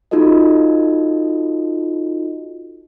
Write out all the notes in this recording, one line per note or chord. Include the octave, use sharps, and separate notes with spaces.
D#4 F4 F#4 A4 D#5